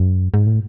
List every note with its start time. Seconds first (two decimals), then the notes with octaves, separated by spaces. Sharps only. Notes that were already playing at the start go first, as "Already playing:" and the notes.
Already playing: F#2
0.34 G#2
0.47 A2